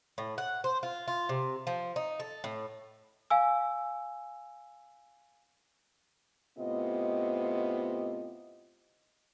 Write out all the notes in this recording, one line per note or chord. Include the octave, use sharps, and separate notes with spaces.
A2
F#5
C5
F4
F4
C3
F3
D#4
A4
A2
F5 G#5 E6
A2 C3 B3 F4 D#5